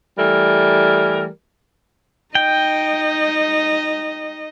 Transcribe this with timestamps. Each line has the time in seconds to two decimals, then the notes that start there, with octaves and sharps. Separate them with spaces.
0.18 E3 G3 A3 A#4
2.35 D#4 D#5 G5